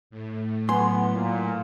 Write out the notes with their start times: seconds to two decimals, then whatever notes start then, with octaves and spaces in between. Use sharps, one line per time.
0.10 A2
0.69 F#3 B3 G#5 C6
1.13 A#2